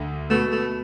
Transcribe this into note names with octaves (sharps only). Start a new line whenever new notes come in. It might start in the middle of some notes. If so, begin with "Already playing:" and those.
Already playing: D2 D3 A3
B2 A3 B3 F#4 B4
A3